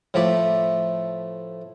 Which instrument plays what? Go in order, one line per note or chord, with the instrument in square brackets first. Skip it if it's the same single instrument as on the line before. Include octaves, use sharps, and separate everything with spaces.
[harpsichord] A2 F3 A3 A4 B5 D6